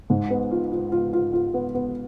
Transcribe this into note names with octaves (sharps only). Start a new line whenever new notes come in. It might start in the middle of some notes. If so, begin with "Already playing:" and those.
G#2
B3
F4
F4
F4
F4
F4
B3
B3